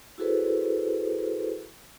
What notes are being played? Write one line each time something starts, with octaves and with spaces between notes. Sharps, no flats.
E4 F#4 G#4 A4 B4 C5